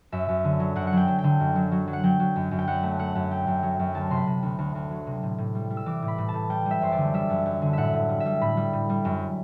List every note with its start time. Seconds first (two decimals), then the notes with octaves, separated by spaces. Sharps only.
0.12 F#2 E5
0.29 F#2
0.44 D3
0.60 F#3
0.76 F#2 F#5
0.87 F#5
0.93 F#3 G5
1.08 F#3
1.19 G5
1.24 D3
1.40 F#2
1.56 F#3
1.72 F#3
1.87 F#3
1.93 F#5
2.03 F#3 G5
2.20 F#3
2.36 F#2
2.51 F#2
2.59 G5
2.67 F#2 F#5
2.83 A3
2.99 A3 F#5
3.15 F#2
3.31 A3 G5
3.47 F#2
3.63 F#3
3.79 F#2
3.95 D2 A5
4.10 C3 C6
4.16 B5
4.27 C3
4.43 D2
4.58 D2
4.75 D2
4.91 F#3
5.07 C3
5.23 A2
5.38 A2
5.55 G3
5.70 G3
5.77 E6
5.86 E3 D6
6.02 A2
6.08 B5
6.18 A2
6.28 A5
6.34 A2
6.49 G3 G5
6.66 G3
6.71 E5
6.82 F#2 C5
6.92 D5
6.97 D3
7.14 G3 E5
7.30 F#2
7.46 F#2
7.62 D3
7.73 A2 E5 F#5
7.94 A2
8.09 G3
8.20 E5
8.25 G3
8.41 A2 B5
8.57 G3
8.73 A2
8.89 G3
9.05 F#2